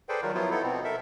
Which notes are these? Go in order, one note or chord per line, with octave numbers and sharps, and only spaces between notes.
G#4 A4 B4 C5 D5 G5
D#3 F#3 G3 F4 A#4
F3 F#3 B3 E4 F4
B3 D#4 E4 A4
B2 B3 C4
A4 A#4 E5